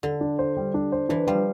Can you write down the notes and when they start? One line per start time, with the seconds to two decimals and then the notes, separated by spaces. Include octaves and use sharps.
0.03 D3 A4
0.21 D4
0.39 C5
0.57 G3
0.74 D4
0.92 C5
1.09 E3 D4
1.27 F3 G3